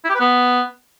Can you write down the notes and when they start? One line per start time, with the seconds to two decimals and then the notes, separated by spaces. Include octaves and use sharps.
0.05 E4
0.10 G4
0.15 B4
0.20 B3